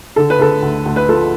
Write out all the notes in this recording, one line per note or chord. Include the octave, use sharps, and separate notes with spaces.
D3 A4
B4
D3 A4
D2
D2
B4
F3 A4